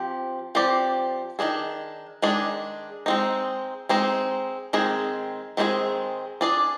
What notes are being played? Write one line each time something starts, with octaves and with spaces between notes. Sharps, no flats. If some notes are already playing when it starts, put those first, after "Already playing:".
Already playing: F3 C4 G4
F3 C4 G4 D5
D#3 G#3 D4 G#4
D#3 G#3 D4 G#4
G#3 C4 D#4
G#3 C4 D#4
D#3 G#3 C4 D#4 G#4
D#3 G#3 C4 D#4 G#4
D4 G#4 D5